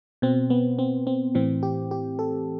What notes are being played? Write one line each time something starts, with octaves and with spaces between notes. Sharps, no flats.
B2 C4
B3
C4
C4
A2 E3 C4
G4
G4
A4